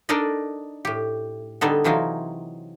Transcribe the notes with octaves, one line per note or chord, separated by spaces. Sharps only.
D4 D#4 A4 A#4 D5 D#5
A2 G4
D3 G3 B3 D#4 A4
C3 E3 F#3 D#4 F4